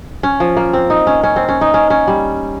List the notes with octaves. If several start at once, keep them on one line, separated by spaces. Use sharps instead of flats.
C#4
F3
A#3
C4
D#4
C#4
C#4
C4
C#4
D#4
C#4
C#4
G3